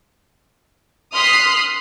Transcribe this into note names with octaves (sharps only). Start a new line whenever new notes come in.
C6 D#6 F6 F#6 B6 C7